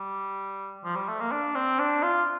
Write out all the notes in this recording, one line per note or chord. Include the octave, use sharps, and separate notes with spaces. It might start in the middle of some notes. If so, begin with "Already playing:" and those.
Already playing: G3
F3
G3
A3
A#3
D4
C4
D4
F4